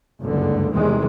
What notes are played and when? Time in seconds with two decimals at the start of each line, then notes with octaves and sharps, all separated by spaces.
0.21 F#1 C#2 G2 D3
0.73 E2 C3 D#3 E3 G3 G#3